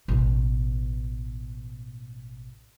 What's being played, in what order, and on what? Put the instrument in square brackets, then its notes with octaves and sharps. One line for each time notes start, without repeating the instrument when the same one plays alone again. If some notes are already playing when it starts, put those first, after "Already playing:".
[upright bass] A1 B2